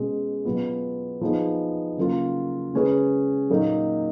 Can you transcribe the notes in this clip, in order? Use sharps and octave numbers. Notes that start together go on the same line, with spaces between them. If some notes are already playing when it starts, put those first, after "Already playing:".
Already playing: B2 G#3 C#4 G#4
B2 F#3 B3 F4
F3 B3 D#4 G#4
C#3 F#3 A#3 F4
C#3 G#3 C#4 G#4 B4
A#2 F#3 A#3 D#4